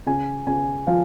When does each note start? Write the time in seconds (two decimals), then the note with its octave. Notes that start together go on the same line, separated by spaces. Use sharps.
0.06 C#3 G#5
0.47 C#3 G#5
0.87 F3 F5